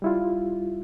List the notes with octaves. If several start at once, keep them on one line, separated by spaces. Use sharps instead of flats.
G3 E4 F4